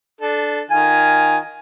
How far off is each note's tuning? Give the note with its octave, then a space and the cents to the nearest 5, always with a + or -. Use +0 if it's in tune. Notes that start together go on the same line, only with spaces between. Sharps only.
D4 +0 A4 -15
D#3 +0 F4 +0 G#5 +5